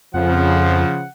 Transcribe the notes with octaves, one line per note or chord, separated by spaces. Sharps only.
F2 C#3 F3 F#5